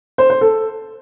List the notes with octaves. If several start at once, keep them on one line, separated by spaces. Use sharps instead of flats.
C5
C5
A4